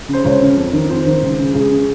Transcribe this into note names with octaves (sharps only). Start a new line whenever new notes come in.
C#3 C5
C#2 C#5
C#3
F2
D#3
F2 C5
D#3
C#2
C#3
C#2 G#4
C#3